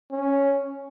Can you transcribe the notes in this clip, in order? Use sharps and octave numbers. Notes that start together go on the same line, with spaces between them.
C#4